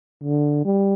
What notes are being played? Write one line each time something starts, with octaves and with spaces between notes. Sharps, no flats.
D3
G3